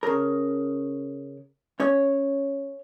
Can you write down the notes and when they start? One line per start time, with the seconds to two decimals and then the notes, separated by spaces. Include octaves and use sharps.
0.03 C#3 A#4
1.80 C#4 C#5